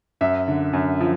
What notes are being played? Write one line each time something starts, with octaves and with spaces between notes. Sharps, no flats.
F#2 E5
D3
F#2
F3